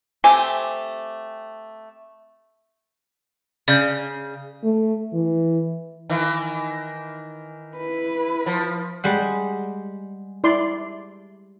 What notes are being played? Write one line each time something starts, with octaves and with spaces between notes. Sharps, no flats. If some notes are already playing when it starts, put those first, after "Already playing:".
A3 C4 G4 G#5
C#3 D5 G6
A3
E3
D#3 E3
E4 B4
F3
G3 G#3 F#5
E4 D5 C6